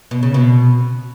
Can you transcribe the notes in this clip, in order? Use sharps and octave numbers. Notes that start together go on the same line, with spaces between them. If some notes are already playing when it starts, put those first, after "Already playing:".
B2
C#3
B2